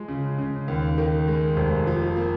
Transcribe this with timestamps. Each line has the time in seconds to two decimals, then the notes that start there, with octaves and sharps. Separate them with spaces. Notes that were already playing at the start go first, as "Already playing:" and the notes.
Already playing: F3 G#3
0.08 C#3
0.38 C#3
0.68 D#2
0.98 D#3
1.28 G#3
1.56 F1
1.87 F3
2.16 A#3